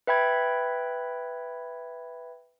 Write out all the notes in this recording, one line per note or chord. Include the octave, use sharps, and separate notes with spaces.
B4 E5 G5 B5 G#6